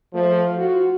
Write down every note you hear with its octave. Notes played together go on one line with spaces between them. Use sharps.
F3 A3
F4 F#4